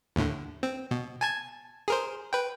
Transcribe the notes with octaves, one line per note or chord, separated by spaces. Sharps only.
D#2 A2 D3
C4
B2
G#5 A5 G#6
G#4 A#4 C5
B4 G5